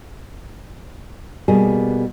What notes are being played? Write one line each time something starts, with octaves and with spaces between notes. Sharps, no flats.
B2 G3 A#3 G#4